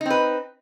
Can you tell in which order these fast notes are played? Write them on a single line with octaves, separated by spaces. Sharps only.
D#4 C4 B4